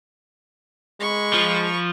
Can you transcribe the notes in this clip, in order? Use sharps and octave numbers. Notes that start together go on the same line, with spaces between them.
G#3 B5 C#6
F3